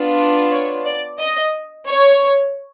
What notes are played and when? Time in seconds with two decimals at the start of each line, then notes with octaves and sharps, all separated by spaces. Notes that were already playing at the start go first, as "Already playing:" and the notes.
Already playing: B3 D4 F4
0.52 C#5
0.85 D5
1.19 D#5
1.87 C#5